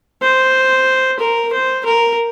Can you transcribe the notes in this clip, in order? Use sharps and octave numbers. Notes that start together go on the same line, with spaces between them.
C5
A#4
C5
A#4